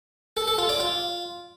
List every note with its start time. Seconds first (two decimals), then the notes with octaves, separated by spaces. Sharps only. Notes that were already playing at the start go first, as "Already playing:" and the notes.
0.37 A4
0.48 A4
0.58 F4
0.69 D5
0.80 F4